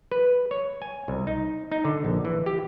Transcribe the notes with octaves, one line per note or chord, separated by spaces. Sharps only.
B4
C#5
G#5
C2
D#4
D#4
D3
A#1
E3
G4